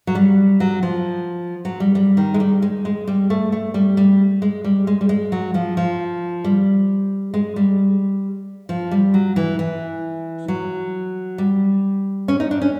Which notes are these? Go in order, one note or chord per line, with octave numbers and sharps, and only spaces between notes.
F#3
G3
F#3
F3
F#3
G3
G3
D#3
G#3
G3
G#3
G#3
G3
A3
A3
G3
G3
G#3
G3
G#3
G3
G#3
F#3
F3
F3
G3
G#3
G3
F3
G3
F#3
E3
E3
F#3
G3
C#4
D#4
D4
C#4